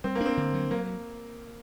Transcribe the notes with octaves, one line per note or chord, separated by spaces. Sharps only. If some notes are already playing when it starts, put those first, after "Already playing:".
G3 C4
A#3
D4
C4
D3
F#3
F#3 A#3